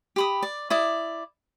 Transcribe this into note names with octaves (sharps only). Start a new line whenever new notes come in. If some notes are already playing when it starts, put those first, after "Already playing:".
G4 B5 D#6
D5
E4 D5 D#6